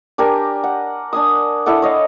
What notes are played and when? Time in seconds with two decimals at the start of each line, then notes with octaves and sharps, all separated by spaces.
0.18 D4 G4 A#4 G#5
0.64 F#5
1.13 D4 G#5 D#6
1.66 E4 A4 D5 F#5
1.82 C#5 D#5 F5